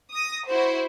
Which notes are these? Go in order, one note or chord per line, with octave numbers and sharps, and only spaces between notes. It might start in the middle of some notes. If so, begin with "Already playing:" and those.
D#6 A#6
E4 F#4 C5